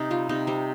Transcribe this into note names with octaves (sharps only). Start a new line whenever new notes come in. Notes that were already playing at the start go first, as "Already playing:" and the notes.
Already playing: C3 D#4
G3 F4
C3 D#4
G3 C4